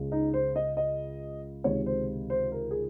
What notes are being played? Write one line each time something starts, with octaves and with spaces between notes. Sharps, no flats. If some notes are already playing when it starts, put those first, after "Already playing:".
Already playing: C#2 C#3 G#3
D#4
C5
D#5
D#5
C#2 C3 D#3 G#3 C#5
C5
C5
A#4
G#4